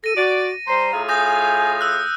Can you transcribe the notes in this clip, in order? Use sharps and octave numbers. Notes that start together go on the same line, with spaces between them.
A4 A#6 D#7
F#4 D5
G3 C5 A#5
A2 F4 G#4
G#5 D#6 G6 A#6
E6 F#6